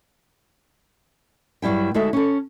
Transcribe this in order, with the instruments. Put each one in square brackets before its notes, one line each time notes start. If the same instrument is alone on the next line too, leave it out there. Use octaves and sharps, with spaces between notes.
[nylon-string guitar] G2 F#3 G3 E4 G5
D2 G#3 D#4 F#4 A4 E5
C#4 A4